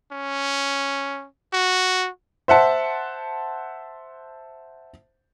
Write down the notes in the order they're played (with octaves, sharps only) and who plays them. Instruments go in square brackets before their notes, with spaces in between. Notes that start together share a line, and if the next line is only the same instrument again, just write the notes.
[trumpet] C#4
F#4
[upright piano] C5 E5 F#5 A5